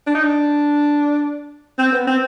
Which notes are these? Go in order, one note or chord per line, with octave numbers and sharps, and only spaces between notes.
D4
D#4
D4
C4
B3
C4